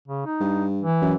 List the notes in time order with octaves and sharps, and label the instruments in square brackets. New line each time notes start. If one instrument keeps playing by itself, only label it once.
[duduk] C#3
D#4
[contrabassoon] G2
[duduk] E3
[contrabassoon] F#2